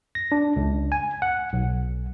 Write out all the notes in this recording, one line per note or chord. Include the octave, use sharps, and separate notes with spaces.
A#6
D4
C#2
G#5
F#5
B1